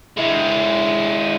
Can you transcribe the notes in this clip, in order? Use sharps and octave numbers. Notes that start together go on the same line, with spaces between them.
G#3 E4